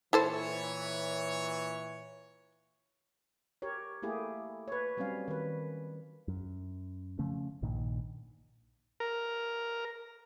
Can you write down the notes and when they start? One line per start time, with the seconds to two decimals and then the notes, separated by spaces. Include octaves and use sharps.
0.13 A#2 E3 E4 A4 C5 C#5
3.62 G4 A#4 C#5
4.02 A3 A#3 E4 G4 G#4
4.68 B4 C#5
4.97 F#3 G3 C4 C#4 F5
5.28 D#3 B4
6.28 F#2
7.19 C#3 F3 A3 C#4
7.62 A#1 G2 A#2 D#3
9.00 A#4